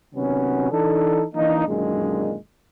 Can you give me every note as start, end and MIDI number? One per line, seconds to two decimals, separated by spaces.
0.14 0.69 48
0.14 0.69 51
0.14 0.69 54
0.14 0.69 59
0.14 0.69 61
0.71 1.23 52
0.71 1.23 62
0.71 1.23 63
0.71 1.23 69
1.35 1.64 52
1.35 1.64 58
1.35 1.64 62
1.35 1.64 63
1.67 2.35 42
1.67 2.35 46
1.67 2.35 50
1.67 2.35 51
1.67 2.35 56